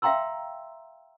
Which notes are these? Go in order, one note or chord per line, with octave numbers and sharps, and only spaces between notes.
E5 F5 G5 A#5 C6 E6